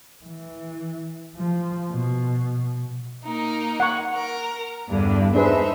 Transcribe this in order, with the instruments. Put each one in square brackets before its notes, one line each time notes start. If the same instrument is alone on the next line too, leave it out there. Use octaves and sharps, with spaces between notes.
[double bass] E3
F3
B2
[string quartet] A#3 D#4 A#4
[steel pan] F#5 C#6
[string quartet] A#4
E2 G2 D3
[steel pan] D4 G#4 B4 [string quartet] D#4 C5 E5